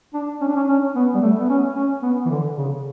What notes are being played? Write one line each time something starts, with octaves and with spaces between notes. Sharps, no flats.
D4
C#4
D4
C#4
C#4
B3
G3
A3
B3
C#4
C#4
B3
E3
D3
C#3